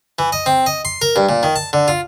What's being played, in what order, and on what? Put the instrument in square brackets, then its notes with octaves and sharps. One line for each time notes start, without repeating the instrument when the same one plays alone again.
[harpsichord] E3
D#5
C4
D#5
C6
A#4
G2
A#2
D#3
A5
D3
F4